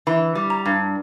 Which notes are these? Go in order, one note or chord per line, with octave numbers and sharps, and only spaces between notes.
E3 B5
G3
A#5
G2